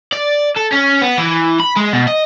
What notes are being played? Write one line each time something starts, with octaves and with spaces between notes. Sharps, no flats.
D5
A4
C#4
B3
E3
B5
G#3
B2
D#5